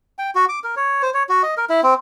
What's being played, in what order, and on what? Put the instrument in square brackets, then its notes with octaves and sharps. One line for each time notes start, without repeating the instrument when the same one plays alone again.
[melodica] G5
F#4
D6
A#4
C#5
C5
C#5
F#4
D#5
A#4
E4
C4